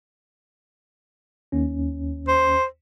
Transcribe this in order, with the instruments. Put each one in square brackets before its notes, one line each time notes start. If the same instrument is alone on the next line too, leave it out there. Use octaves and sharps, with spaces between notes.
[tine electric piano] D#2 C#4
[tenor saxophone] C5